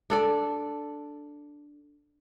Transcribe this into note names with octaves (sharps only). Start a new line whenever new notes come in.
D4 A4 D5